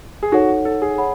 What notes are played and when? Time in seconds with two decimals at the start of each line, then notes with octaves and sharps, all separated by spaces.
0.23 G#4
0.32 D#4 F#4 A4 C#5 F#5
0.65 A4
0.82 G#4
0.98 C#5 F#5 B5